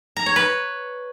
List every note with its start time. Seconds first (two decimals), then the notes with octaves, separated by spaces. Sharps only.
0.17 A#5
0.26 C#5
0.36 B4